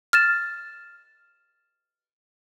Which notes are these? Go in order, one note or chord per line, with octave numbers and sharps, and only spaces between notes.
F6 A6 E7